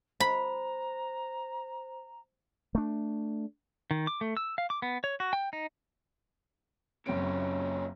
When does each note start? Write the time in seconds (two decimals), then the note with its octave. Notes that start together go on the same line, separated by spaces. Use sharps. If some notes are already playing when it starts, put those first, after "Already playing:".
0.20 C5 A#5 B5
2.75 A3 D4
3.91 D#3
4.07 D6
4.21 A3
4.37 E6
4.58 F5
4.70 D6
4.82 B3
5.04 C#5
5.20 F#4
5.33 G5
5.53 D#4
7.06 F#1 A#2 C4 C#4 D7